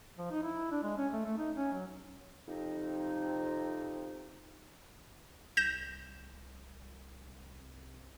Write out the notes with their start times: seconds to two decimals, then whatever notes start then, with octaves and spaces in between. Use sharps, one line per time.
0.18 F3
0.31 D#4
0.43 E4
0.72 D4
0.84 G#3
0.97 C#4
1.13 A3
1.25 A3
1.37 D#4
1.56 C#4
1.73 F#3
2.47 F2 C3 D#4
5.57 C2 G6 A#6 E7